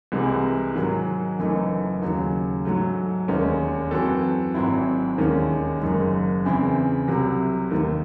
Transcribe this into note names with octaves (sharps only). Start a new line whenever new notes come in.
C2 C3 E3 G#3
G#2 D#3 F#3
F#1 F#2 E3 A3 D#4
D#2 C#3 F#3
G#2 F#3 A3
E1 D#2 D#3 G#3 C#4
F#2 E3 C4 F#4 A4
G#1 G#2 F#3 C4 E4
E1 D#2 D#3 G#3 C#4
F#1 F#2 D#3 G#3
E2 C#3 E3 C4 E4
C2 C3 F#3
D#2 D#3 A3